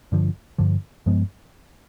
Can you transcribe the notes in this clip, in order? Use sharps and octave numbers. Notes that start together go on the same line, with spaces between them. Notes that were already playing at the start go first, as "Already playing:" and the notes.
G2 D3 F3
G2 D3 F3
G2 F3 G#3 B3